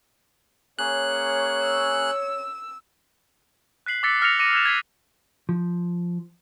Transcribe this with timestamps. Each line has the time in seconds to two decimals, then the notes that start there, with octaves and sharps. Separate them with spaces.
0.79 A#3 C#4 G#4 C#5 F#6
1.62 E6
3.86 F#6 B6 C7 F#7
4.03 D6 E6 A6 B6 C#7
4.21 E6 F6 A#6 C7 C#7 F7
4.39 D6 A#6 C#7 D#7 E7
4.53 E6 F#6 G#6 B6 E7
4.65 G#6 A6 B6 C7
5.49 F3